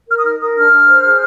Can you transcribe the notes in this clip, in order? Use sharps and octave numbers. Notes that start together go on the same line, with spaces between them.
A#4 F6
D#6
D#4 F6
A#4 D#6
D4 F6
D4
C5
G#4